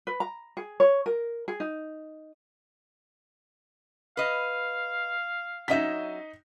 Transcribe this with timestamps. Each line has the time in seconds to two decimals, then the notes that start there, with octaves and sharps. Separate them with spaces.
0.07 B4
0.20 A#5
0.57 G#4
0.80 C#5
1.06 A#4
1.48 G#4
1.60 D#4
4.17 B4 D#5 F5
5.68 F#3 C#4 D#4 D#5 E5 B6